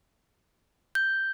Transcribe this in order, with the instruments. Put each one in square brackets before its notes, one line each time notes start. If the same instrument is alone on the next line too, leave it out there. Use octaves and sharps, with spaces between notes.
[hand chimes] G6